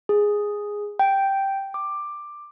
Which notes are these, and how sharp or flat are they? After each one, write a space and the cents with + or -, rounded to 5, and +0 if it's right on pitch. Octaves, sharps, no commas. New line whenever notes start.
G#4 -5
G5 -5
D6 +10